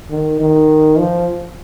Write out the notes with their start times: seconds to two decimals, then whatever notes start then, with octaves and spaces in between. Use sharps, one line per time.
0.10 D#3
0.40 D#3
0.98 F3